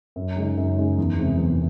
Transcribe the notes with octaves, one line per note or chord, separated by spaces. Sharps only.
F#2
C#3 G#3 D#4
F#2
C#3 G#3 D#4
E2
C3 E3 G#3 C4
E2